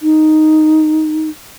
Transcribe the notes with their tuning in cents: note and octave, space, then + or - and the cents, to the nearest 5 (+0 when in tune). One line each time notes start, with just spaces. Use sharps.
D#4 +0